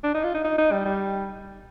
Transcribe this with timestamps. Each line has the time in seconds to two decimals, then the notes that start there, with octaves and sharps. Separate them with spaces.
0.04 D4
0.14 D#4
0.24 F4
0.34 D#4
0.44 D#4
0.58 D#4
0.72 G3
0.85 G3